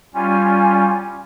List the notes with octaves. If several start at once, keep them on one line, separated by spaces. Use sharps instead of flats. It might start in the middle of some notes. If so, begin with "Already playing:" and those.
G3 C#4 F4 G#5